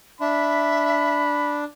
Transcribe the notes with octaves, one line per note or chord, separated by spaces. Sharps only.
D4 E5 B5